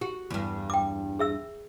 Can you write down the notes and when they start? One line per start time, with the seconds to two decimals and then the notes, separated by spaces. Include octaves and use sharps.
0.01 F#4 G4
0.30 E2 G2
0.70 G5 D6
1.19 G#4 E5 E6